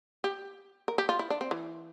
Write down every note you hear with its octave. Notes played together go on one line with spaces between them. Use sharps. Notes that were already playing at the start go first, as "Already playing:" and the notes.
G4
A#4
G4
F4
E4
D4
C4
E3